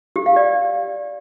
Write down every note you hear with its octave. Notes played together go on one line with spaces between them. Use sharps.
G4
F5
D5